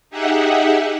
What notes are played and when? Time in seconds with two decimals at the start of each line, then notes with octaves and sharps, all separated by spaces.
0.10 D#4 G4 G#4 E5 F#5